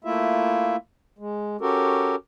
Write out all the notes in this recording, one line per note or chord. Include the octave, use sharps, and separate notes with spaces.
A3 A#3 E4 F4 E5
G#3
C#4 F#4 G4 A4 A#4